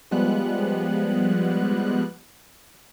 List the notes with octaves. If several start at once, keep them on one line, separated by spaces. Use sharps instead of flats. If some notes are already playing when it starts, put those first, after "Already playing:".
F3 G3 G#3 B3 F#6